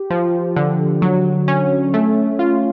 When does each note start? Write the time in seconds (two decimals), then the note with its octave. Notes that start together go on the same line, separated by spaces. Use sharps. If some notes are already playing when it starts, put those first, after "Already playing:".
Already playing: G4
0.10 F3
0.56 D3
1.02 F#3
1.48 C#4
1.94 A3
2.39 F4